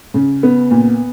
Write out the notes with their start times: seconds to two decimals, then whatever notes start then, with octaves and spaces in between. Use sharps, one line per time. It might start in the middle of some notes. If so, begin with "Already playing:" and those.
0.14 C#3
0.43 B3
0.71 A#2